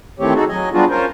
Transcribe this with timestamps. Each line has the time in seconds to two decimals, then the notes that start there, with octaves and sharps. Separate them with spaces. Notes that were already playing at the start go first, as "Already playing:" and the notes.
0.19 D#3 E3 A3 C4 G4 C#5
0.35 D#4 F#4 G#4 A4
0.49 F#3 D#5 G#5
0.73 G3 B3 D4 F4 F#4 G#4
0.90 C#4 F4 A#4 C5